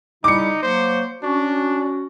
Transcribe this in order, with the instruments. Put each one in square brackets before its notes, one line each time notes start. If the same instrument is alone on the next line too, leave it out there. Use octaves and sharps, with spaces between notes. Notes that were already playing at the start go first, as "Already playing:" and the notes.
[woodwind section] C#3 G3 E4 [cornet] D#4 [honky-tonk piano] D6 C#7
[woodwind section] F#3 A#3 [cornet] C5
[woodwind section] C#4 F#4 [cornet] D4